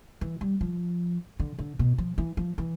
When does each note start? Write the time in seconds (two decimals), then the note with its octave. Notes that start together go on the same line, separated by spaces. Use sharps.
0.21 E3
0.41 G3
0.61 F3
1.40 D3
1.59 D3
1.79 B2
1.98 F3
2.18 E3
2.37 F3
2.58 E3